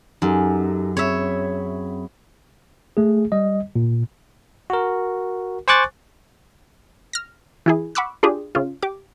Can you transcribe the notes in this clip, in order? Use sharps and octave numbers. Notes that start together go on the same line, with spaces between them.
F#2 D#4 G4 A4
C4 G#4 C#5 E5 B5
A3 G#4
G3 D#5
A#2
F#4 A#4
C5 G#5 C#6 D6 F#6 A6
F6 A#6
E3 E4 G#4
F#5 B5 C#6 D6 E6 F#6
D4 F4 G4 G#4
C#3 F4
G4 D6